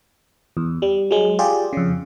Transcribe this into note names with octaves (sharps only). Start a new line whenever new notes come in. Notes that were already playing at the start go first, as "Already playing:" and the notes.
E2
G3
F#3 G#3
F4 G4 G#4 D5
F2 C#3